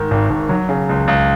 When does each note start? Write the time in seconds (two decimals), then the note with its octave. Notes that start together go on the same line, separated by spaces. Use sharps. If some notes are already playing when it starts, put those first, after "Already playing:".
Already playing: G#2 D#3
0.11 G#1
0.30 G#1
0.49 F#3
0.69 C#3
0.89 C#2
1.08 C#2